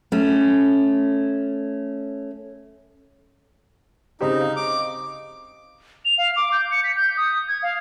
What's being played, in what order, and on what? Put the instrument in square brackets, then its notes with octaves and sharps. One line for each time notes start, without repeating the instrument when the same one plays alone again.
[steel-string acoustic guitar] A3 C#4
[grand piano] C#3 C4 G4 [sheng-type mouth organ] D#4
[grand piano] F5
[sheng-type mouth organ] D6
[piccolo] F7
F5
D6
G6
C#7
B6
G6
D#6
G#6
F5